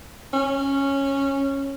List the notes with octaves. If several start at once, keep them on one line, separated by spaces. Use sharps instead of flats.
C#4